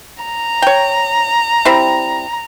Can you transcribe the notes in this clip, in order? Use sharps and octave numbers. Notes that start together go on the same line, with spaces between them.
A#5
C#5 G5
G3 C4 E4